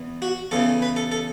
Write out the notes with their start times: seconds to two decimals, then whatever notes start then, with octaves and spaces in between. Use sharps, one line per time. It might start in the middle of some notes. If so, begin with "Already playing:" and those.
Already playing: E2 E3 B3
0.22 F#4
0.51 E2 C#3 E3 A4
0.82 B4
0.96 A4
1.12 A4